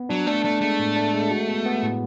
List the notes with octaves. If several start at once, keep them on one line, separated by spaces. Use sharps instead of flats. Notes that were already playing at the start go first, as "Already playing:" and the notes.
Already playing: B3
F#3 D4
A3 D4
A3 D4
G#3 A3
A2
D4
G#3
F#4
B3
B3
A2